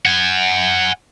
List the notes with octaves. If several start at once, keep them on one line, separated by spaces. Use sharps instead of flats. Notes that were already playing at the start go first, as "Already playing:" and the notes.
F#5 G#5